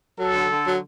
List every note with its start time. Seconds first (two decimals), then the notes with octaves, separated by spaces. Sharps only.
0.18 F#3 A4
0.34 D3
0.50 D3
0.65 F#3